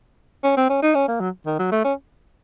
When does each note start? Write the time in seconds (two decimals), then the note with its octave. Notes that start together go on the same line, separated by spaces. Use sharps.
0.44 C#4
0.57 C4
0.70 C#4
0.82 D#4
0.95 C#4
1.08 A#3
1.20 F#3
1.46 D#3
1.59 F#3
1.72 A3
1.84 C#4